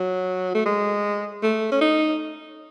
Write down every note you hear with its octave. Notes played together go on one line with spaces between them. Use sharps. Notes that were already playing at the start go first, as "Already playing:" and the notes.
Already playing: F#3
A3
G#3
A3
C#4
D#4